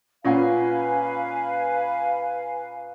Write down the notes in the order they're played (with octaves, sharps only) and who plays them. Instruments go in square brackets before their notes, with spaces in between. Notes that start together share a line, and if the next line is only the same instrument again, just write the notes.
[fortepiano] A#2 C#4 [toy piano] F4 F#5 [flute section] B4 F5 G#5